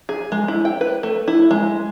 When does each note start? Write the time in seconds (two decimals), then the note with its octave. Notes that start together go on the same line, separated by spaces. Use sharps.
0.09 G#4
0.32 G#3
0.48 E4
0.65 G5
0.81 B4
1.03 A3
1.28 E4
1.51 G#3